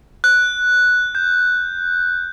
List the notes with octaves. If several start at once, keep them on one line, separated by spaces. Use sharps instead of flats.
F#6
G6